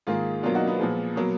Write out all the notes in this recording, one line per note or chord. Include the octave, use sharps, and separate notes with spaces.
G#2 D#3 A#3 F4 G#4
B2 F#3 A#3 D4 F4
D#4 F#4
B3
A#2 F3 G#3
B2 F#3 A#3